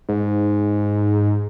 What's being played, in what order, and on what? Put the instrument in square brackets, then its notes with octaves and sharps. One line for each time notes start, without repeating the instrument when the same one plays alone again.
[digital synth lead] G#2